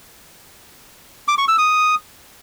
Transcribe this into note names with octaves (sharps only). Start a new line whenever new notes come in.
D6
C#6
E6
D#6